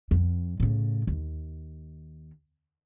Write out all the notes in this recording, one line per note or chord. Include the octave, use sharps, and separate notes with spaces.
F2
A2 C#3
D#2